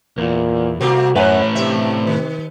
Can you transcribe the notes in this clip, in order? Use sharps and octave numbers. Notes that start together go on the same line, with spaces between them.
E2 A#2 A#3
C2 A3 A#3 C4 F#4
F#2 A2 C#4 B4 C#5
G2 C3 C4 E5 A#5
D#3